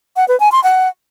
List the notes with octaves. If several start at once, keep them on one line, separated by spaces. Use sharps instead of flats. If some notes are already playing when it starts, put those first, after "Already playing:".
F#5
B4
G#5
C6
F#5